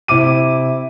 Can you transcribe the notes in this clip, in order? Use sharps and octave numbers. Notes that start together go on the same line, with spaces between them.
C3 E4 D6 D#7